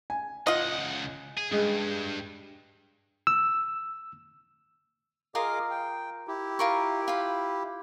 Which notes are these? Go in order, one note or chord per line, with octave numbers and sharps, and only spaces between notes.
G#5
C#2 F4 D#5 F#5
G#4
G2 G#3 G#4
E6
F4 G#4 A#4 D#5 F5 D6
G5
E4 G4
F4 A#4 C#6
F4 B5